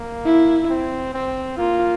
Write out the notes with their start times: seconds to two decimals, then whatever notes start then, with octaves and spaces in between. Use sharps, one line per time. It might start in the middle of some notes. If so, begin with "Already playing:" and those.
Already playing: A#3
0.25 E4
0.70 C4
1.14 C4
1.57 A#3 F4